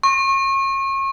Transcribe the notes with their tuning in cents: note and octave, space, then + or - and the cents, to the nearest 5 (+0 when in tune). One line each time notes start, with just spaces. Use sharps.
C#6 -35